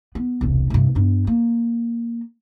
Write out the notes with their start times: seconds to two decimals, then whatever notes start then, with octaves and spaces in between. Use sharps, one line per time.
0.15 B3
0.41 E1 C2
0.70 C2 G2
0.95 G2 B3
1.27 A#3